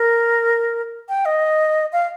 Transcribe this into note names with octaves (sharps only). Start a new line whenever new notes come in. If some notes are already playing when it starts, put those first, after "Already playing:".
Already playing: A#4
G5
D#5
F5